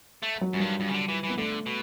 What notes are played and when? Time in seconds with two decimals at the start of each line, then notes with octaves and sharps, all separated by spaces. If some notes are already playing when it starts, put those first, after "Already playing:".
0.23 A3
0.41 F#3
0.53 F#2 G3
0.60 G2 F#3
0.79 G2 G3
0.88 C#3
0.94 D3
1.08 E3
1.23 E3
1.30 B3
1.37 D3 A3
1.66 B2